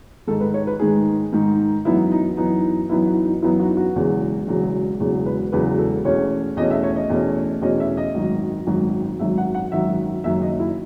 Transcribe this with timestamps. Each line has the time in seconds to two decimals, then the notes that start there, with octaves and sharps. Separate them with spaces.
0.28 G#2 D#3 G#3 D#4 A4
0.41 B4
0.54 C#5
0.67 B4
0.80 G#2 D#3 G#3 D#4 G#4
1.33 G#2 D#3 G#3 D#4
1.85 F#2 E3 B3 D#4 E4
2.12 D#4
2.37 F#2 E3 B3 D#4
2.89 F#2 E3 B3 D#4 E4
3.07 F#4
3.25 D#4
3.42 F#2 E3 B3 D#4 E4
3.60 F#4
3.77 F#4
3.95 E1 E2 C#3 F#3
4.47 E1 E2 C#3 F#3
5.00 E1 E2 C#3 F#3
5.26 B4
5.52 E1 E2 C#3 F#3 B4
5.78 A4
6.05 E2 B2 A3 C#4 C#5
6.57 E2 B2 A3 C#4 D#5
6.71 E5
6.84 C#5
6.96 D#5
7.10 E2 B2 A3 C#4
7.62 E2 B2 A3 C#4 D#5
7.80 E5
7.97 D#5
8.15 G#1 F#2 D#3
8.67 G#1 F#2 D#3
9.20 G#1 F#2 D#3 E5
9.38 F#5
9.54 F#5
9.72 G#1 F#2 D#3 E5
10.24 F#1 F#2 D#3 E5
10.42 D#5
10.60 E4